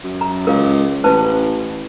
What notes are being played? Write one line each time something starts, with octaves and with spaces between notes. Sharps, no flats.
F#2
A#5
C#2 A#4 F5
A1 B4 C5 A5